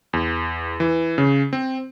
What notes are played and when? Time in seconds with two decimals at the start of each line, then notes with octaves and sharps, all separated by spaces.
0.13 E2
0.80 E3
1.18 C#3
1.53 C4